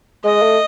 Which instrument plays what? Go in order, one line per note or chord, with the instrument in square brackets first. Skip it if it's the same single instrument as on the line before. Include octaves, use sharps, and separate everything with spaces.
[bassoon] G#3 [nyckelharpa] D#5
[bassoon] A3